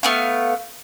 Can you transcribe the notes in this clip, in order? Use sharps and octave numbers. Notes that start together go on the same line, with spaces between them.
A3 B3 F5